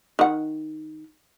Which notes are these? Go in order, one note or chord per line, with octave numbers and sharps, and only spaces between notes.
D#3 F#5